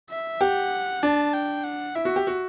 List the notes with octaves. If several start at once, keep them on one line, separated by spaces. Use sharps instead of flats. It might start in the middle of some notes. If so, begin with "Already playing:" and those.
E5
G4 F#5
D4 A5
G5
F#5
E4 E5
F#4
G4
F#4